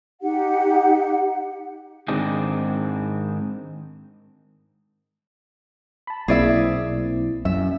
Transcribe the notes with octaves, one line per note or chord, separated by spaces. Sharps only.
D#4 G4 F#5
G#2 D#3 C4 D4 D#4 G#4
A5 B5
B1 A#3 C4 E4 G#4 D5 E5
F#2 E5